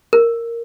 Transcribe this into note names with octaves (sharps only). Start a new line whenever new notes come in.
A#4